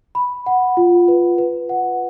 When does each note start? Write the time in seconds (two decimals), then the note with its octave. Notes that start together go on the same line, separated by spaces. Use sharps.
0.15 B5
0.46 F#5
0.77 F4
1.08 B4
1.38 B4
1.69 F#5